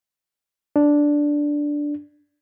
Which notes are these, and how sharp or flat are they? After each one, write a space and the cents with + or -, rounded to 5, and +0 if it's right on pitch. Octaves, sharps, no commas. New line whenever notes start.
D4 -5